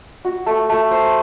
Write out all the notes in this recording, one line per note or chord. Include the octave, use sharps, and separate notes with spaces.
F#4
A3
A3
C5